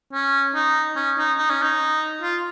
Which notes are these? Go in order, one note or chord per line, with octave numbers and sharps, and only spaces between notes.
C#4
D#4
C#4
D#4
D#4
C#4
D#4
F4